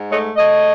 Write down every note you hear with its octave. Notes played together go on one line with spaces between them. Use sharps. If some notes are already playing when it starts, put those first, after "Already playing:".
Already playing: G#2
A3 C#5 D#5
A3 C#5 D#5